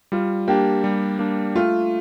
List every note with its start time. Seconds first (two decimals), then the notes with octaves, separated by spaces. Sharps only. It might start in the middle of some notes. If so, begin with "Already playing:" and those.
0.12 G3 F4
0.48 A#3 D4 G4
0.84 G3
1.19 A#3 D4
1.55 A3 F4